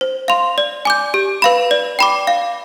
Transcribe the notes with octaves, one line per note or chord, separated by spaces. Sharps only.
C5
F5 C6
D5
G#5 D6 G6
G4
B4 F5 B5
D5
G5 B5 D6
F5